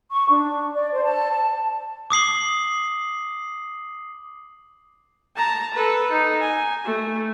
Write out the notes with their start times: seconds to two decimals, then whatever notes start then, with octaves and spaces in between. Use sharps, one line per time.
0.11 C#6
0.28 D4
0.72 D5
0.92 C5
1.03 A5
1.30 A5
2.10 D6 D#6 C7 F#7
5.37 A5 A#5
5.74 A4 B4
6.11 D#4
6.40 G#5
6.84 A3